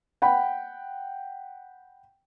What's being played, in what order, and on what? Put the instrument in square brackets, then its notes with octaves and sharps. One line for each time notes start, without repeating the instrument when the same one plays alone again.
[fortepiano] F#5 G5 B5